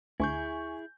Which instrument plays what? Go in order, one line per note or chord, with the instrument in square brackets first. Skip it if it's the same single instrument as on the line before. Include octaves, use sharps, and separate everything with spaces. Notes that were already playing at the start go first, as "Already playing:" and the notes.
[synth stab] D2 [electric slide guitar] E4 G#4 [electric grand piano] G#5 C#6 G6